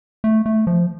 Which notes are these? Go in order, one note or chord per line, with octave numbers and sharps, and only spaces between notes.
A3
A3
F3